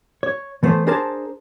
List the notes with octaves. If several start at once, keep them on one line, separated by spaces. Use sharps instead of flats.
C#5
E3 A3 B3 C5
D4 G#4 A#4 C5 A5